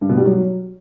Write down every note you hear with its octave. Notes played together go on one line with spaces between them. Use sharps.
G2
B2
G3
F#3